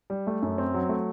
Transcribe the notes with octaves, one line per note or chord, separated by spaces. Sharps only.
G3
A3
F#2
C4
F#3
A3